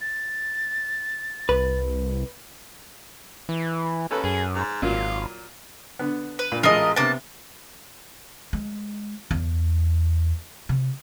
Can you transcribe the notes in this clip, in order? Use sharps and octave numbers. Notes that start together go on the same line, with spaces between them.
A6
C2 B4
E3
D#2 C#4 A4 B4
F#2 G#4
G#2
G#1 A#2 F#3 A#3 F4
D3 B3
B4
A#2
A1 G#3 F4 A#4 D#5
C3 A#3 B3 A5
G#3
E2
C3